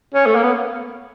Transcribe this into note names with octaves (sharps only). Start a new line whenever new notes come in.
C#4
A3
A#3
B3